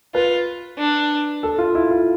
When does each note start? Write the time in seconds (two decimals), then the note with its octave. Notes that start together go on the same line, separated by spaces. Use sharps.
0.14 F4 B4
0.79 D4
1.43 A4
1.59 F4
1.75 E4
1.91 F4